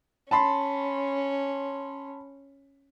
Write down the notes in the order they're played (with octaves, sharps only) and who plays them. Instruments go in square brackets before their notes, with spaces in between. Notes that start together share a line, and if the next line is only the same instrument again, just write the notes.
[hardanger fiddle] C#4 [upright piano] A5 B5 C6